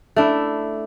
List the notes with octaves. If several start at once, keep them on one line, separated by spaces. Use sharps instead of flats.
A3 D4 E4